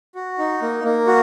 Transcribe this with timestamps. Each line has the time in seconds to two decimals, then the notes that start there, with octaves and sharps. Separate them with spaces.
0.15 F#4
0.38 D#4
0.62 A#3
0.84 A#3
1.07 F#4